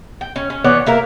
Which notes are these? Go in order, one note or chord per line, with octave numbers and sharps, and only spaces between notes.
G5
C#4
C#4
E3 B3 C#5 D5
A#3 E4 A#4